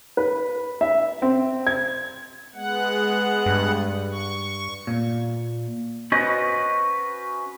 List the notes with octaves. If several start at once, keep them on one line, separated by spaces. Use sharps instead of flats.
B4
E5
C4
G#6
G#3 B3 F#5
G2
C#6
A#2
C#4 F#4 B4 C5 D#5